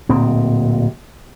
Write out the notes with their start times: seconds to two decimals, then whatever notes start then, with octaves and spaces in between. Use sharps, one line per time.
0.09 D1 A#2 C4